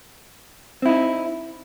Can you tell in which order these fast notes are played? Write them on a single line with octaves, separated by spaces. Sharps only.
C4 E4 D#4